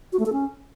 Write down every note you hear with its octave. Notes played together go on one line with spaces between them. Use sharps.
F#4
A3
A4
C#4